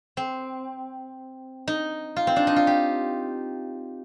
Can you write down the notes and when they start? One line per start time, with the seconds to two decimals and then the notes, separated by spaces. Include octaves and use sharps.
0.17 C4
1.68 D#4
2.16 F4
2.27 C4
2.36 D4
2.47 D#4
2.56 F4
2.67 G4